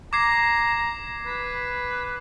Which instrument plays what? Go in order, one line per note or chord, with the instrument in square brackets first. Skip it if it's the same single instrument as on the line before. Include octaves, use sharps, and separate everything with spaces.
[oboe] A#5 [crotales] D6 G#6 C7
[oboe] B4